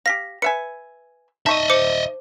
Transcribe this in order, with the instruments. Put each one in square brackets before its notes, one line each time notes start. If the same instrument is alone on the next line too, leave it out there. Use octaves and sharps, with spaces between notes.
[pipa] G4 F5 [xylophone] A#6 B6
[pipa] B4 E5 G#5 [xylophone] C#7
[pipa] D#4 C#6 [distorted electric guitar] D#5 E5 [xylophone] A5
[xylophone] C5 D6 C#7